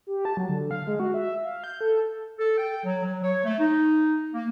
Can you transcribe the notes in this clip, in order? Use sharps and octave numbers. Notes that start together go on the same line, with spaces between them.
G4
A5
F#3
D3
F5
G#3
F#4
E5
F5
G6
A4
A4
G5
F#3
F#3
C#5
A3
D#4
A#3